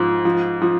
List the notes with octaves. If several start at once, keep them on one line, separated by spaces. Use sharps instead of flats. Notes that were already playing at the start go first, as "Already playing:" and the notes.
Already playing: G#2 F3
F3
F3